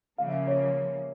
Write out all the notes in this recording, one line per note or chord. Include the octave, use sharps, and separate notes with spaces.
C#3 F3 A#3 F5
E5
C#5